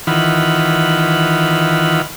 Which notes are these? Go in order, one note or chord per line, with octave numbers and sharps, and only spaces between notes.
D#3 E3 F4 F#5 B5